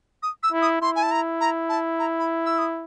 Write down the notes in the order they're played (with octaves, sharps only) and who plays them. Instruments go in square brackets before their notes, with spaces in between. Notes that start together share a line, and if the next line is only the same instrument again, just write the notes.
[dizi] D#6
E6
[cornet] E4
[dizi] D#6
[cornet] E4 [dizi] C6
[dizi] G#5
A5
A#5
A#5
A5
A#5
B5
E6
D#6